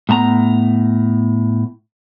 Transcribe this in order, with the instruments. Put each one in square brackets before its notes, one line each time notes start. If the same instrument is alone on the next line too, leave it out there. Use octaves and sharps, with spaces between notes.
[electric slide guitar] A2 B3 A5 A#5